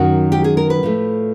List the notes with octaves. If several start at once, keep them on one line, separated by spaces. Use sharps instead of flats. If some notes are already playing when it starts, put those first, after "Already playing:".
Already playing: F#2 D#3 F#3 F#4
G4
G#4
A#4
B4
A2 F3 A3